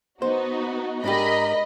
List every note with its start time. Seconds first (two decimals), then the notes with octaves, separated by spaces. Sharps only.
0.22 B3 D#4 F#4 C5
1.04 G#2 D4 G4 A#4 D#5 B5